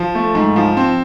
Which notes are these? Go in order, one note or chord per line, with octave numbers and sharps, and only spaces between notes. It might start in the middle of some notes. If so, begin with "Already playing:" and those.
Already playing: F3
A3
G#2
F3
C4